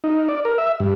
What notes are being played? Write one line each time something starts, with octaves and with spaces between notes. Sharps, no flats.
D#4
D5
A#4
E5
G2